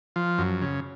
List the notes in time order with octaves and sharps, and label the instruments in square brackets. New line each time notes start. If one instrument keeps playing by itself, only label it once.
[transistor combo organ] F3
F#2
C#3